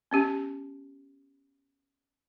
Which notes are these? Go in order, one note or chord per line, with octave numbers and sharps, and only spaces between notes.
B3 C#4 G4